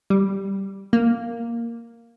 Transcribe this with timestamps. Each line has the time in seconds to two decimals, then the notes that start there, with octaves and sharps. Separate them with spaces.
0.10 G3
0.93 A#3